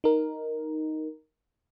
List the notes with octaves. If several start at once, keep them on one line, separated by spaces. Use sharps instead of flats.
D#4 A#4